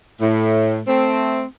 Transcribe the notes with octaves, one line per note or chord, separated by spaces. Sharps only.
A2
A3 C4